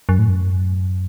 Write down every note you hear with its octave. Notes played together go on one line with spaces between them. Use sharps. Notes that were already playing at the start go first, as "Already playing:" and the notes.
F#2
A2
F#2